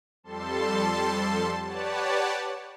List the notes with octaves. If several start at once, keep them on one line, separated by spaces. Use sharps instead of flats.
F2 G3 A4 A5 C6
G4 B4 C#5 D5 F#5 A5